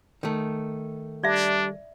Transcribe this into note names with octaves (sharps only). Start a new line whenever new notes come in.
D#3 A3
G3 D4 D5 E5